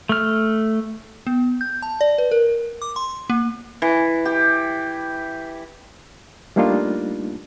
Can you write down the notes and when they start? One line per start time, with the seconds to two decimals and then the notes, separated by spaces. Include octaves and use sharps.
0.09 A3 F6
1.27 B3
1.61 G6
1.82 A5
2.01 D5
2.18 B4
2.31 A#4
2.82 D6
2.96 C6
3.30 A#3
3.82 E3
4.25 G4
6.56 G3 A3 A#3 D4 D#4 F4